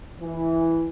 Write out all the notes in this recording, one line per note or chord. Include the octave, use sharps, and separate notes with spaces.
E3